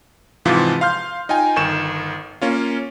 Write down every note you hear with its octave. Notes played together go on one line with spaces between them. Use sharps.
G#2 C3 E3 F3 F4
F5 C6 F6 G6
D#4 F4 G5 G#5
G1 D#3 C#6 E7
A#3 C#4 F4